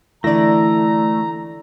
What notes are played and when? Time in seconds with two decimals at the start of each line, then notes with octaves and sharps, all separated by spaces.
0.24 D3 E3 A3 E4 D5 A#5 A#6